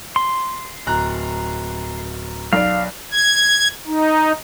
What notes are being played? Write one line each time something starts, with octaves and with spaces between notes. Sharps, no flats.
C6
D1 A#5 F#6
B1 D5 F5
G#6
D#4